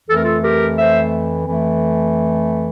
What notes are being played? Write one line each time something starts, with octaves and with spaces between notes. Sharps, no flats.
F2 E3 A3 A4
A#4
F4 A4
G4 A#4
C5 E5
F2 E3 A3